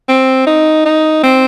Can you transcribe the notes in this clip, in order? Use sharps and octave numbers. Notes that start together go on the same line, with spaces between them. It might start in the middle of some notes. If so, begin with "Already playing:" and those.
C4
D#4
D#4
C4